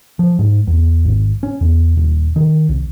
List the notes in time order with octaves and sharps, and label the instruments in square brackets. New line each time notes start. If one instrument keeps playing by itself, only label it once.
[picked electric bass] F3
G#2
E2
G#1
C#4
E2
D#1
D#3
C2